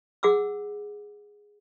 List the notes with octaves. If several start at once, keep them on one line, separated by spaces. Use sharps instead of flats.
G#4 F#5 D6 E6